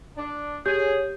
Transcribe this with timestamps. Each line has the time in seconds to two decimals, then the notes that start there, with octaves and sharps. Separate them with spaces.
0.17 D4
0.66 G4 G#4 C#5 G6